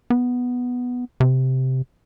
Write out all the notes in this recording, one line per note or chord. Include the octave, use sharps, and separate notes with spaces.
B3
C3